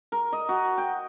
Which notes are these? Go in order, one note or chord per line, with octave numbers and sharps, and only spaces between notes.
A#4
D#5
F#4
G5